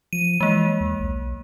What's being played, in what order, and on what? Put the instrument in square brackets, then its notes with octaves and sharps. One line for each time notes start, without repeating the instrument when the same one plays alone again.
[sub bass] F3 [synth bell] D#7
[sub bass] E3 [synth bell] G#3 A#3
[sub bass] D#2
B1